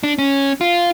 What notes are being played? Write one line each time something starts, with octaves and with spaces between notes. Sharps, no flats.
D4
C#4
F4